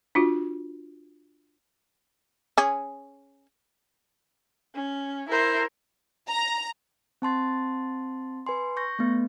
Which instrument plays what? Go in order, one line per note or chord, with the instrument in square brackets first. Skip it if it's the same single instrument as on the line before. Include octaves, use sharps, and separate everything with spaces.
[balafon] D4 F4 F#4
[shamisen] C#4 G#4
[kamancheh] C#4
[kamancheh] E4 C5 [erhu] A#4
[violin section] A#5
[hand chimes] C4 A5 C6 A6
B4 G#5 C6
C#6 G6 A#6
A3 B3